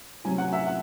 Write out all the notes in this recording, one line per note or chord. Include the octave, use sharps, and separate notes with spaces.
C3 F#3 C#4 G#5
F#5
E5
F#5